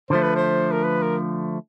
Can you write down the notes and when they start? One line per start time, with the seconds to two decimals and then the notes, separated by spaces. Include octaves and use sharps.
0.10 D3 F3 A3 C5
0.22 B4
0.36 C5
0.72 A#4
0.84 B4
1.03 A#4